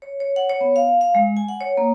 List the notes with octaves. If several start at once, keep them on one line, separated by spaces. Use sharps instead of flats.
C#5
C#5
F#5
C#5
B3
F5
F5
G#3
G#5
F#5
C#5
A#3